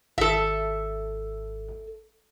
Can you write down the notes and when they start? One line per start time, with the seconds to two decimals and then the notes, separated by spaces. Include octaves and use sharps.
0.18 G#1 A4 E5